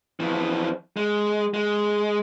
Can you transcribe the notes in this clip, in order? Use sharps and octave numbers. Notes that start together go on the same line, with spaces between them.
F2 E3
G#3
G#3